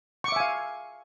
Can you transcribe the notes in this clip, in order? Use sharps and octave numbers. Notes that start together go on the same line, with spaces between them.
E5 F5 G#5 C#6 D6